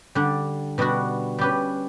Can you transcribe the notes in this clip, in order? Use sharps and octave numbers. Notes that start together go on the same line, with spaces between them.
D3 G3 D4
B2 G3 D4 F#4
G3 C#4 G4 B4